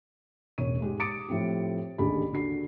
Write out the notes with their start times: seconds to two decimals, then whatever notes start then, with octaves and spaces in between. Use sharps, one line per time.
0.58 E1 A1 C#5 D#7
0.81 G#2 G#3 G4
1.00 D6 D#6 A6 C#7 D7
1.29 A2 F3 A3 C4 G4
1.98 A1 D#2 D3 G4 G#4 B5
2.33 D3 F#4 C7